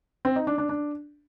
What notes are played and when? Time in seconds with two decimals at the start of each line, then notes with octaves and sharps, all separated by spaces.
0.25 C4
0.36 D#4
0.47 D4
0.58 D4
0.69 D4